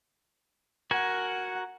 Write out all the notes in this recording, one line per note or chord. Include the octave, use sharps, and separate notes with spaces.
F#4 A#4 F#5 G#5